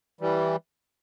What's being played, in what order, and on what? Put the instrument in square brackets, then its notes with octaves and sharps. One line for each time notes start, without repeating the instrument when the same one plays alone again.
[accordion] E3 G3